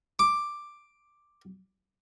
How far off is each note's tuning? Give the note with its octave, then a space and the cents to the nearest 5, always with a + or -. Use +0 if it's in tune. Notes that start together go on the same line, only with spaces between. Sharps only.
D6 +5